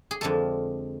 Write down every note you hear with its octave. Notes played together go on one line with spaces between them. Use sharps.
G#4
F2 D3 F3 G#3 A4